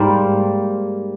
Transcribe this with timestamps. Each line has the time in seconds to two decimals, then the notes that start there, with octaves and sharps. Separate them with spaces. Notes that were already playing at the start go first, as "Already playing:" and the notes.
Already playing: G#2 G3 A#3 C5